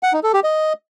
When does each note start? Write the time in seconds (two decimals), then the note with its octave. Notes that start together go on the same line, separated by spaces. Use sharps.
0.03 F#5
0.13 D#4
0.23 A4
0.34 G4
0.44 D#5